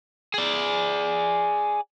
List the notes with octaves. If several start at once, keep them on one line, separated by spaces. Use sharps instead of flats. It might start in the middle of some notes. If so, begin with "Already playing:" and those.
G#4 D5